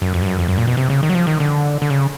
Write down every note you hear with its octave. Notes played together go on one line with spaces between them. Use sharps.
F#2
F2
G2
F#2
F2
F#2
A#2
B2
C3
C#3
D#3
F#3
F3
D#3
D3
D3
C#3